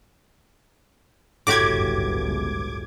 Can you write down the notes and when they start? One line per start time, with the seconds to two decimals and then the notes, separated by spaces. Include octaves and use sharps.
1.47 G1 C#2 F#2 A2 F#4 G4 D6 G#6